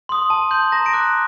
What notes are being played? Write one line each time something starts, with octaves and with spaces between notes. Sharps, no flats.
C6 D#6
A5
C6 G6
A#5 A#6
D7
D6 F#6